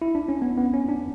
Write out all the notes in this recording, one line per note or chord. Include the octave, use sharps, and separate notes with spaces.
E4
D4
C#4
B3
B3
C#4
D4